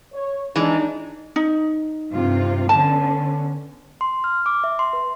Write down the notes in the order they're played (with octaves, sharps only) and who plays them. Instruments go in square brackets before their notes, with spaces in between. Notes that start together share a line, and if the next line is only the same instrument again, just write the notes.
[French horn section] C#5
[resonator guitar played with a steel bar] E3 G#3 [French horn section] D4 D#4
[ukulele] D#4
[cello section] G2 C3 F4
[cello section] D3 B3 C#4 [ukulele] A5
[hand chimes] C6
F6
D6
E5
C6
B4